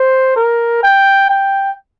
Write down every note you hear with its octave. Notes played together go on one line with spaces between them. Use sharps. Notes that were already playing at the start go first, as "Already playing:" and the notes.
Already playing: C5
A#4
G5
G5